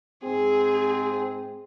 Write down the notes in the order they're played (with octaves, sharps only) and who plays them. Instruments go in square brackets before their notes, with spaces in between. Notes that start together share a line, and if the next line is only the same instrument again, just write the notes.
[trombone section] G#2 C4 [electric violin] G#4